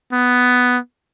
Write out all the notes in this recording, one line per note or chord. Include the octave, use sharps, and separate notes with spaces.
B3